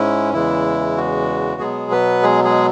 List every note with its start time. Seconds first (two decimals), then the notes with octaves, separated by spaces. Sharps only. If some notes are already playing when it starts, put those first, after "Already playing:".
Already playing: G#2 G#3 C#4 E4
0.33 E2 C#3 E3 G#3 E4
0.97 F#4
1.60 B2 F#3 G#3 B3 G#4
1.91 B3 B4
2.23 G#3 G#4
2.44 G#3 G#4